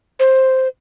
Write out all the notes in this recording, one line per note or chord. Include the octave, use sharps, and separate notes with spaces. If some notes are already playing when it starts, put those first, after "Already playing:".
C5